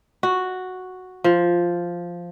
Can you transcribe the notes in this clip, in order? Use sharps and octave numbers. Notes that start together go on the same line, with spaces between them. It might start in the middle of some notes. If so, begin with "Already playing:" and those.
F#4
F3